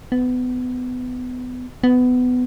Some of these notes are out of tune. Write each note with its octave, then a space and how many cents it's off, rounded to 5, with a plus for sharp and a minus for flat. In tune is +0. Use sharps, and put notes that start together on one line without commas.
B3 +25
B3 +20